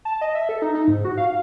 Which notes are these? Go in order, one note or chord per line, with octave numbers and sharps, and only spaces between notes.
A5
D#5
E5
A4
D#4
D#4
G#2
F#4
F5